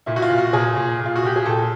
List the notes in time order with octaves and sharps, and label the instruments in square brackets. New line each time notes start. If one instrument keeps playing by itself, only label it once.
[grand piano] A#2 E4
F#4
F4
A#2
F#4
A#2 G#4
A#2
A#2
F4
F#4
A#2 G4
G#4
A#2 A4